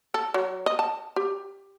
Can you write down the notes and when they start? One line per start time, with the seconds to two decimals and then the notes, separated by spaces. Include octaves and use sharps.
0.14 A4
0.34 F#3
0.66 D#5
0.79 A5
1.16 G4